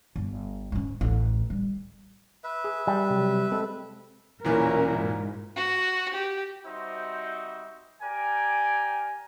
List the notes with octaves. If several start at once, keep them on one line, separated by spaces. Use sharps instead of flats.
G1
G#2 C#3
A1 D2
G3
B4 E5
G#4
G3
C3 F#3
G#3 C4 A4
E1 A#2 E3 C#4 E4 A#4
G#2
F#4
G4
G3 C4 D#4 F#4 C5 E5
G4 A#4 D5 G5 G#5